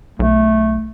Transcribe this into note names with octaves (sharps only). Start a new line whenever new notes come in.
B1 A3